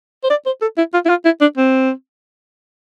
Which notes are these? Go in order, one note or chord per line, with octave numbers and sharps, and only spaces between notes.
C5
D5
C5
A4
E4
F4
E4
F4
E4
D4
C4